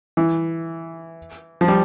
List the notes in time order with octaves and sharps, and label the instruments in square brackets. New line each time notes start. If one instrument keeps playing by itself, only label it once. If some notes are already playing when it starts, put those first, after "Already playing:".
[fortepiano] E3
F3
G3